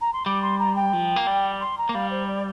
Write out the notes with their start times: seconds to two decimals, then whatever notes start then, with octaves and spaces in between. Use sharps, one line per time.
0.01 A#5
0.13 C6
0.26 G3 D6
0.42 C6
0.59 A#5
0.76 G5
0.93 F3
1.16 A#3
1.27 G3
1.60 C6
1.78 A#5
1.89 A#3
1.94 G3 F5
2.11 C5
2.27 D5